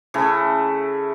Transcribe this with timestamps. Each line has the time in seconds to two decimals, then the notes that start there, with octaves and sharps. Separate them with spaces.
0.14 C#3 A3 E4